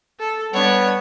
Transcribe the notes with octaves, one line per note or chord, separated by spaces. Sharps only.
A4
G3 B3 D4 C#5